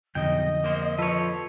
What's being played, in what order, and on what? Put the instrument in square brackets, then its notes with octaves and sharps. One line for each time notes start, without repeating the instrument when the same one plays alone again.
[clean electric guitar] B1 G5 [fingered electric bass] F2 D3 [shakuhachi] D#5 [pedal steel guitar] G6
[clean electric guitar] A#3 C5
[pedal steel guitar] F3 A4 E6 [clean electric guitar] B4 C#5